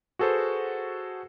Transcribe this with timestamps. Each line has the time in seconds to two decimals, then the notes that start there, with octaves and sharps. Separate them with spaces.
0.19 F#4 G#4 A4 B4 C5